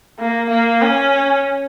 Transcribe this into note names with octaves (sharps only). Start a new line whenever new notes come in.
A#3
A#3
C#4